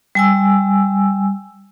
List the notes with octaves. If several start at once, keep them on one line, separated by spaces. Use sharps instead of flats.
G3 G#5 E6